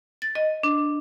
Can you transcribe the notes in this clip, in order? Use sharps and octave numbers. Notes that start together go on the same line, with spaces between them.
A6
D#5
D4